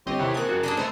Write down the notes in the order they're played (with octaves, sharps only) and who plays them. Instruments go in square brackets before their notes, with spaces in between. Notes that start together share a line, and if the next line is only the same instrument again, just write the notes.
[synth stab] G1 C4 D#5 [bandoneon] G4 C#5 C6
[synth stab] C3 D#3 E3 [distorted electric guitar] E4 F#5
[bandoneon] A#3 C4 A5 [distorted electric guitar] G#4 A#4 [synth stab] D#6 F#6
[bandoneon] F#2 [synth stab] F#4
[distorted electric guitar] D3 [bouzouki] A#3 D4 G#4 [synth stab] D#5 F#6
[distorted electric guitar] A3 [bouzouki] B3 [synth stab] C5 A#5 C6